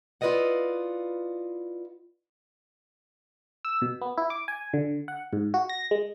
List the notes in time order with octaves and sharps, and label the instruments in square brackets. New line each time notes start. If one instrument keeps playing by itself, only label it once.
[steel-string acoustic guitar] E4 F4 B4 D5 D#5 F#5
[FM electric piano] E6
B2
B3
E4
D6
G#5
D3
F#5
G#2
F#4
A#6
G#3